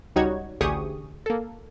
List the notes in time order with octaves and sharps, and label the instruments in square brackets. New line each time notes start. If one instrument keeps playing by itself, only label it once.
[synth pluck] C#2 G3 D#4 F#4 C#5 G#6
A1 D2 G4 G#4 C#6 D#6
A#3 A4